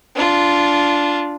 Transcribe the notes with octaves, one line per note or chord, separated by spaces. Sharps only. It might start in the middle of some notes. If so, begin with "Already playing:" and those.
D4 F4